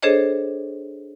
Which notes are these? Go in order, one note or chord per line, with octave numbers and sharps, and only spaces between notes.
D4 G#4 A4 C5 C#5 D#5